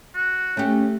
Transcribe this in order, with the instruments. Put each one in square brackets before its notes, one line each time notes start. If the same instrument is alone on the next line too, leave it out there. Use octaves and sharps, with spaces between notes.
[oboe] F#4
[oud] A3 G4 [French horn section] C#4